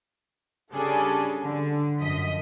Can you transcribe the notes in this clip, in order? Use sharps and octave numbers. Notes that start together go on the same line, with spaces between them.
C#3 G3 C#4 D4 G#4 A4
D3
F#2 F3 D#5 B6